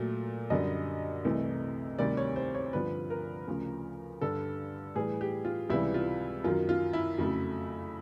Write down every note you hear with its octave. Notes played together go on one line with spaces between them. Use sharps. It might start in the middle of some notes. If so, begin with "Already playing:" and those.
Already playing: A#2 F#3 A3
F#2 D3 G3 D#5
C2 C3 E3 A3
D2 C3 D#3 G3 D5
C#5
C5
C#5
G2 D3 F3 B4
A#4
D2 C#3 F3
G2 D3 G3 A4
A2 E3 G3 G#4
G4
F4
C#2 C3 E3 G3 E4
F4
F#2 D#3 F#3 F4
F4
E4
F2 C#3 F#3 A3